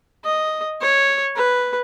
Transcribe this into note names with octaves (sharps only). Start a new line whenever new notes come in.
D#5
C#5
B4